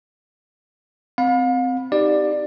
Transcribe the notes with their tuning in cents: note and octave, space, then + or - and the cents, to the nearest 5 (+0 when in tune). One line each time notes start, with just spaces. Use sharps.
C4 -15 F5 +40 B5 +0
D#4 +0 G4 +0 D5 +15